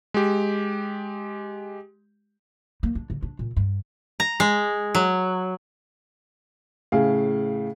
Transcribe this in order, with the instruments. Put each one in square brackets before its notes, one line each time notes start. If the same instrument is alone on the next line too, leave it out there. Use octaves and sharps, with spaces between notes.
[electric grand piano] G#3 G4
[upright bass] A#3
D4
D3
D4
A#2
G2
[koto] A#5
G#3
F#3
[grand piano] A2 C#3 G#4 F5